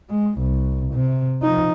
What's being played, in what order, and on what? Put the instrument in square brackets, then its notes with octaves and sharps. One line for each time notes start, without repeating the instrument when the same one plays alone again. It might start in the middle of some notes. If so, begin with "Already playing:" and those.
[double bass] G#3
C2
C3
F3 D#4